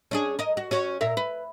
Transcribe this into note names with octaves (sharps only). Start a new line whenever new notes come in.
C#4 D4 G#4
A#4 D#5
F#4
C#4 F#4 C#5
A#2 A#4 E5
B4